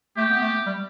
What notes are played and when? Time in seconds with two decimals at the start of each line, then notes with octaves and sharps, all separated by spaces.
0.17 A3 G4
0.30 B3
0.41 A3
0.66 G3